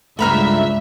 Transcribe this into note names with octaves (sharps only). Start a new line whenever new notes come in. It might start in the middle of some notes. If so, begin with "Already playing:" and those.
C#2 G2 A3 B4 E5 A#5 F6